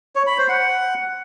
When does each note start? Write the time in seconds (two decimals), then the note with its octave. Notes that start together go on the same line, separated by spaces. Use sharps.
0.16 C#5
0.27 B5
0.38 C5
0.49 F#5